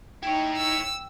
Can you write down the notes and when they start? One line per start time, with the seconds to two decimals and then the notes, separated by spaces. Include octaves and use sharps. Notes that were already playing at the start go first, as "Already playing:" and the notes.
0.23 D#4 E4 C#5 G5
0.57 E6